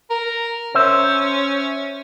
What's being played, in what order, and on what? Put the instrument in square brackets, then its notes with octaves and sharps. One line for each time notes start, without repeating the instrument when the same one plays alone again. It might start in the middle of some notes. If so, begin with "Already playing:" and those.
[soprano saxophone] A#4
[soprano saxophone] C#4 [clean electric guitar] C5 E5